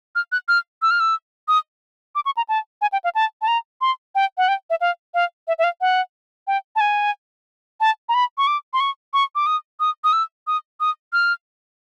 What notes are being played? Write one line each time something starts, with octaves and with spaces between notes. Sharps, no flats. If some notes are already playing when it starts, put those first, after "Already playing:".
F6
F#6
F6
E6
F6
E6
D#6
D6
C#6
A#5
A5
G#5
G5
F5
A5
A5
A#5
C6
G5
F#5
G5
E5
F5
F5
E5
E5
F5
F#5
G5
A5
G#5
A5
A#5
B5
C#6
D6
C6
C#6
C#6
D6
D#6
D#6
D#6
E6
D#6
D#6
F6